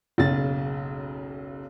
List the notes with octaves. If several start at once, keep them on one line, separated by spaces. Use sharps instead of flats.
F#1 B1 C#3 A6